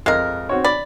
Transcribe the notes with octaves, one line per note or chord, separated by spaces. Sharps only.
F2 G#3 A#4
C4 F#4 C#5
D5 B5